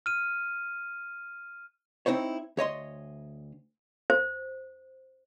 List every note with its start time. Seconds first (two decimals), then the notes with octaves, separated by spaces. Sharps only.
0.06 F6 D#7
2.06 C4 D#4 E4 C5 C#5
2.57 D2 C#5 D#5 C6
4.10 C5